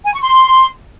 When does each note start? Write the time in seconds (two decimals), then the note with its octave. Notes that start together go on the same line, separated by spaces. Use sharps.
0.05 G#5
0.14 C#6
0.22 C6